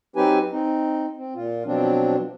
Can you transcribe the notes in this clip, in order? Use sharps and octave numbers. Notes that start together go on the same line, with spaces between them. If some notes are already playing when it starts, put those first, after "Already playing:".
F#3 C4 D#4 G4 B4 G#5
C4 D#4
C4
A#2 F4
B2 F3 F#3 C4 D4